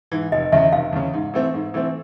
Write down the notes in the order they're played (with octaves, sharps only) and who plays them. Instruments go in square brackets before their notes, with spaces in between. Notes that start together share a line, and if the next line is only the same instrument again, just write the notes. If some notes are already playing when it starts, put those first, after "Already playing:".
[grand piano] G#2 E3
[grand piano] F1 [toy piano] D#5
[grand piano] E2 C#3 [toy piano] E5
[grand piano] F1 [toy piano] F5
[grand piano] E2 C#3
G#2
E3 A3 C4
G#2
E3 A3 C4